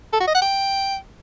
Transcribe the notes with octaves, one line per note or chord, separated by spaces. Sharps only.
A4
F#4
D#5
F#5
G5